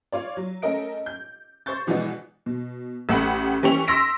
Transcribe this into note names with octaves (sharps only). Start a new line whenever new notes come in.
F4 C#5 D5
F#3
A3 C#4 A4 A#4 D#5 D7
G6
C5 C#6 G6 A6
B2 E3 F3 G#3 B3 D4
B2
A1 A3 G4 F#5 B5
E3 G3 C#4 G5 C#6 F7
C6 D#6 E6 A#6 B6 D7